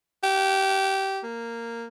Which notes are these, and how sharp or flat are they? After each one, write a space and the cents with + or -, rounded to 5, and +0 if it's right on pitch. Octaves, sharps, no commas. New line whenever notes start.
G4 -20
A#3 -10